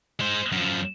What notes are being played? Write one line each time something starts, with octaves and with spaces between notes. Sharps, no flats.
G#3 C5
F#2 F3